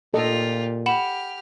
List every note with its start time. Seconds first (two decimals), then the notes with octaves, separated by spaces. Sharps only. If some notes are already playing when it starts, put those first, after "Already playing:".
0.14 A#2 F4 G4 A4 D#5
0.86 G4 F#5 B5 F6 E7